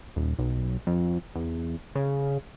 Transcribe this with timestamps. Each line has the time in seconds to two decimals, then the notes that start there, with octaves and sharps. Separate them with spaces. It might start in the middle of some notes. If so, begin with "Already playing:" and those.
0.16 D#1
0.38 B1
0.87 F2
1.36 E2
1.95 C#3